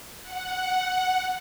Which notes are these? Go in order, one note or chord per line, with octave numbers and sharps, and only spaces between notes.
F#5